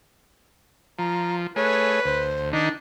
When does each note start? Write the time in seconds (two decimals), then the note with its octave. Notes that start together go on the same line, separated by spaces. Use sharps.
0.99 F3 A#5
1.56 A3 G#4 B4 C#5
2.05 D2 C5
2.53 D#3 D4 D#4